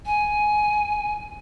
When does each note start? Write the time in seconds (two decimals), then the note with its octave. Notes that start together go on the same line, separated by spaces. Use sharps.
0.06 G#5